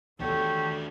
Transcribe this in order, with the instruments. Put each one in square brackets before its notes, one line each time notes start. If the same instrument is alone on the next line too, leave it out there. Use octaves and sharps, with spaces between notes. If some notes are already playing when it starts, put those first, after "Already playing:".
[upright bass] E2 D#3 [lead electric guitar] D4 F#4 [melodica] G4 C#5 [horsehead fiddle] A4